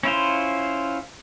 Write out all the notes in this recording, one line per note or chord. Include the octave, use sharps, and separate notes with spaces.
C#4 E4 F4 C5